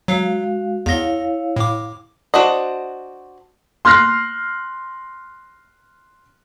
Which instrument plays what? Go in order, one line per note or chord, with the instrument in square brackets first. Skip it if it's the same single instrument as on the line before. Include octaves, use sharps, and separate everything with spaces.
[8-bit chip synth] F#3 [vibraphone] G#3 F#4 F5
[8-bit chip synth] E2 A#6 [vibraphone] E4 C#5 F5
[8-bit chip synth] A2 D6
[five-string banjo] D4 F#4 C5 D#5
[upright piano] C6 F6 F#6 A#6 C7